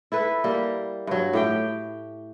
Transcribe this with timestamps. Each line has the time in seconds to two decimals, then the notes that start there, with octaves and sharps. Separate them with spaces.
0.12 E4 A4 B4
0.44 G3 A#3
1.07 G2 F#3
1.33 A2 G4 G5